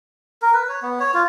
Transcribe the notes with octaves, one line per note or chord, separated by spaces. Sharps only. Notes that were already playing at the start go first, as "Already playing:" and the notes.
A#4
B4
C#5
B3
C#5
F4